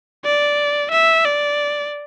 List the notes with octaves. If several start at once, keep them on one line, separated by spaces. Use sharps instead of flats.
D5
E5
D5